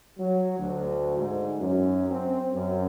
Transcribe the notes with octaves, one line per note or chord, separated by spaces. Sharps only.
F#3
D2
G#2
F#2
C4
F#2